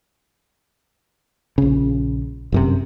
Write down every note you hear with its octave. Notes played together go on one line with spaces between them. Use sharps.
A#1 C#3
G1 F#2 C3